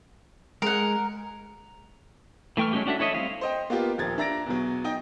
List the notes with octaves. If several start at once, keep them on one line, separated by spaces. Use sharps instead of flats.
G#3 G#4 A#4 F#5
E3 A3 G5 C#6 F6
F#3 G#3 A3 C#4 G4
C#4 D4 F#4 A4 E5
E4 A4 C#5 D#5 E5
G3 C4 D#5 F5
C5 D#5 G5
A#3 B3 F4 G4
D#1 F3 A#4 G#6 A6
D4 E5 A#5 A6 A#6 D7
E2 B2 F#3
D#4 D#5 G5